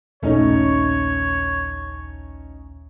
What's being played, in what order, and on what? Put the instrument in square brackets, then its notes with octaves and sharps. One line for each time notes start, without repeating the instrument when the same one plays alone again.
[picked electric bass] D#1 A#1 [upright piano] A3 C#4 D#4 [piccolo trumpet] C#5